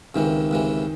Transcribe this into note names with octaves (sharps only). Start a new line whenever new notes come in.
C#2 C3 D#3 E3
C#2 C3 E3